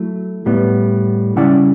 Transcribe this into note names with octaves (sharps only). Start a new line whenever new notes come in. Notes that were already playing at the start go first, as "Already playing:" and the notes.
Already playing: F#3 A3 E4
A2 G3 B3
C#3 G3 C#4 E4 D5 F#5